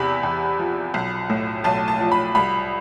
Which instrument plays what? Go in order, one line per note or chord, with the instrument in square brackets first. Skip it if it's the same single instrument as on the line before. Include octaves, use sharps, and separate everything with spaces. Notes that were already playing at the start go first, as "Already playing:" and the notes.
Already playing: [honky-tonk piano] E2 C3 B5
E2
F3
B1
A2
B1 A5
A5
F3
B5
C2 B5